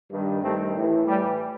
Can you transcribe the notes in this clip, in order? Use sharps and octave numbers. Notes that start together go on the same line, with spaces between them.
G2 D#3
G2 D#3 A3 C4
A2 E3
A2 E3 G3